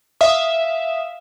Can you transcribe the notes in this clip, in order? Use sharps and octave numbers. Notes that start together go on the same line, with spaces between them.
E5 F5 D#6